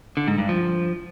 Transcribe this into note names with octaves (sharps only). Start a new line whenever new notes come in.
D3
G#2
G2
F3